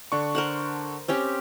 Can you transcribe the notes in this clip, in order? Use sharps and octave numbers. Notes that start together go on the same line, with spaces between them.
D3 D4 C#6
A#4 C5 F#5
C4 C#4 G4